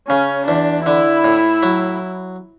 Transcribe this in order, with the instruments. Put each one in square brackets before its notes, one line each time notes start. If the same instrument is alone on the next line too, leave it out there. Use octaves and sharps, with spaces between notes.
[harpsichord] C#3 [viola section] C#4
[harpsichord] E2 [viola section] D4
[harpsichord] D3 [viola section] E4
[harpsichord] A2
F#3